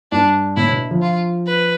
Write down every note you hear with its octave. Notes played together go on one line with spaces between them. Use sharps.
G2 D4
A2 E4
B2
F3
F4
B4